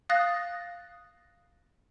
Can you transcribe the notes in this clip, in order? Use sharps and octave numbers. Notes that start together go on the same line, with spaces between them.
F5 D#6 F#6 A6 A#6